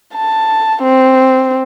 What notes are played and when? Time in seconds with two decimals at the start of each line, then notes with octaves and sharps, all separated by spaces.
0.14 A5
0.83 C4